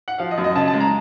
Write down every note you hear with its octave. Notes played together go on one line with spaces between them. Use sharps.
F#5
F3 F5
D#5
F#2
D#5
C#3 A5
A5
G#3
A#5